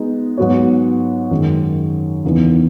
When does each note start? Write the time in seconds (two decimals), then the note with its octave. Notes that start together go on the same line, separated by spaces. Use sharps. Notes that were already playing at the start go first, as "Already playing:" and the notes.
Already playing: G#3 B3 D#4 F#4
0.38 G#2 F#3 B3 F#4 C#5
1.31 F#2 D#3 G#3
2.25 E2 C#3 E3 B3 D#4